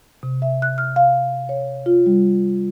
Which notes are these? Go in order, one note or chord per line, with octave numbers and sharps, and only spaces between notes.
C3
E5
F#6
F6
F5
C#5
F4
G3